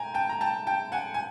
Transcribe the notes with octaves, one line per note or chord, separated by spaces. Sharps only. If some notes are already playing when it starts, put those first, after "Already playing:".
Already playing: G5 G#5 A#5
G5 A5
A#5
G5 A5
G5 A5
F#5 G#5
G#5